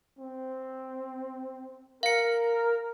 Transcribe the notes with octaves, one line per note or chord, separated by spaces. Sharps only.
C4
A#4 F5 C#7